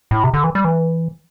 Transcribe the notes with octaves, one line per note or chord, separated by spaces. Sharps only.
A2
C3
D3
E3
G3
E3